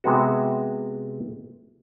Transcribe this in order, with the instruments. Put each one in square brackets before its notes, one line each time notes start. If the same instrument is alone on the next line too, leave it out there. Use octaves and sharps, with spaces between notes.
[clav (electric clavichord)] C3 G#3 B3 F#4